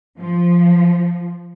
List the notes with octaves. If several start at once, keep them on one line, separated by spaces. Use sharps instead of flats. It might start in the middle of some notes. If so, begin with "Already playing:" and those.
F3